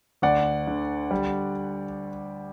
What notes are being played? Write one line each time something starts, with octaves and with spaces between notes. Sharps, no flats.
D2 D5 F#5
D3
G3